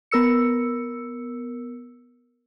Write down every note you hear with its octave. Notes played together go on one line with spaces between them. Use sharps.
B3 A#4 E6 C#7